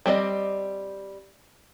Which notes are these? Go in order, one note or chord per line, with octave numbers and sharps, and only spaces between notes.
G3 C4 D5 D#5